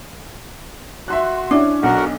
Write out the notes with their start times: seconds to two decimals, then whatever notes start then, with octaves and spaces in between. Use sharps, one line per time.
1.08 F#4 E5 C6 F#6
1.51 C#4 D4 E4 C#5
1.83 B1 F#4 A#4 F#5